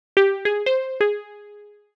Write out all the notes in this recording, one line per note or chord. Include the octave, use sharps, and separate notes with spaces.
G4
G#4
C5
G#4